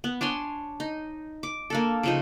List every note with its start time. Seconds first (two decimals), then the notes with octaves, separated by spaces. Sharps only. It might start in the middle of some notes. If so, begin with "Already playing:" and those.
0.04 B3
0.21 D4 C#5 G#5 C6
0.80 D#4
1.43 D6
1.70 A#3 D4 A4
2.03 C#3 F3 D#4